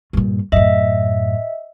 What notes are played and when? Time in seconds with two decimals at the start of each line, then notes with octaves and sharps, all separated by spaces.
0.13 G2 A#2
0.52 F#2 A2 D#5 E5